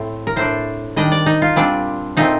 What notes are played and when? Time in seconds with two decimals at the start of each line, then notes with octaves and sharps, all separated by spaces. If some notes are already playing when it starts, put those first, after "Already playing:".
Already playing: A2 A3 C4
0.27 A#4
0.36 A2 A3 D4 C5
0.96 D#3 G3 D4 D#5
1.12 D5
1.26 D#4
1.42 F4
1.56 A#2 G3 C4 D4
2.17 A#2 A3 C4 D#4